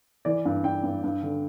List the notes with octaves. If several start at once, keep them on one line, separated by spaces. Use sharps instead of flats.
E3 D5
G2
G2 G5
G2
G2
D3